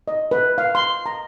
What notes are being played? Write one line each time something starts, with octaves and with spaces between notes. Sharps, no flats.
D#5
B4
F5
C6
A#5